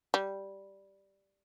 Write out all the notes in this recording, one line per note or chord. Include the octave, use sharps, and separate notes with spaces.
G3